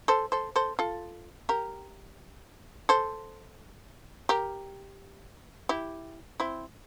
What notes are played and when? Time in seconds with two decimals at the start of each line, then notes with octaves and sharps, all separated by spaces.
0.08 A4 C5
0.32 A4 C5
0.56 A4 C5
0.79 F4 A4
1.49 G4 A#4
2.89 A4 C5
4.29 G4 A#4
5.69 E4 G4
6.40 C4 E4